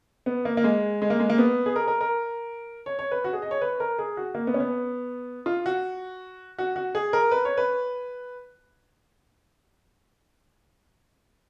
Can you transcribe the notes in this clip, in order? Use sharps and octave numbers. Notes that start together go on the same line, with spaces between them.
B3
A#3
A#3
G#3
G#3
A#3
G#3
A#3
B3
G#4
A#4
A#4
A#4
C#5
C#5
B4
F#4
G#4
D#5
C#5
B4
A#4
G#4
F#4
A#3
B3
C#4
B3
F4
F#4
F#4
F#4
G#4
A#4
B4
C#5
B4